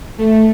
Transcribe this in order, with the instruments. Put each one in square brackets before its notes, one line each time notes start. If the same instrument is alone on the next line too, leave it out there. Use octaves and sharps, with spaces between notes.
[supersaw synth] A3